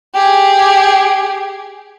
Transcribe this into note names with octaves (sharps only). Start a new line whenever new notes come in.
G4 G#4